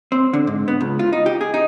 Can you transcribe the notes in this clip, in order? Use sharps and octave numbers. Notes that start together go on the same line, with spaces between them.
C4
D3
G#2
B3
C#2
F4
D#4
G4
G#4
D#4